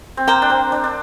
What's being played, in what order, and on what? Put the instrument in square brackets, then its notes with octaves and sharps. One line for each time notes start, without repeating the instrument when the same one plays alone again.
[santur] C4
[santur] A#3 [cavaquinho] C5 G5 A#5
[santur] D4
C4
D4
D4